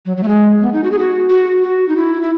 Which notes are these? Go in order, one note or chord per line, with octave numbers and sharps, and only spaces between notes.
F#3
F#3
A3
G#3
B3
D#4
F#4
G#4
F#4
F#4
F#4
D#4
E4
E4